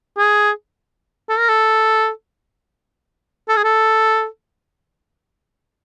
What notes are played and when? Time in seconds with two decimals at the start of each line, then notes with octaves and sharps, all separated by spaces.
0.18 G#4
1.29 A4
1.39 A#4
1.49 A4
3.49 A4
3.57 G#4
3.64 A4